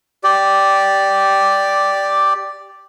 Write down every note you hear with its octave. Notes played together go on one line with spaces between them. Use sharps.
G4 D5